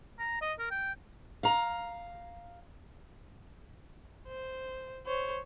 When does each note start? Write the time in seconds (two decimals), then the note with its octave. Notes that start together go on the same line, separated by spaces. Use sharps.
0.19 A#5
0.42 D#5
0.59 A#4
0.71 G5
1.43 F5 A#5
4.27 C5
5.06 C5 C#5